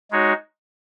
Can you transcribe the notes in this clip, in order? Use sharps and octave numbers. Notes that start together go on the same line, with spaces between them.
G#3 D#4 F#4 C#5